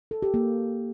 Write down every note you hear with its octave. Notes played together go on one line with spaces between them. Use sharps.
A4
G4
A#3